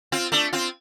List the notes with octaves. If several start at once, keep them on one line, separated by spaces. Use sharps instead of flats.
C4 F4
A3 D4
C4 F4